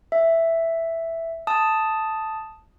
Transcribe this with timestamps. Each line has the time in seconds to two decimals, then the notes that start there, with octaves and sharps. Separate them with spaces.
0.12 E5
1.47 A5 D#6